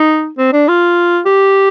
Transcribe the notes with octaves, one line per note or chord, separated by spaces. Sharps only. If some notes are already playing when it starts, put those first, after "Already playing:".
Already playing: D#4
C4
D4
F4
G4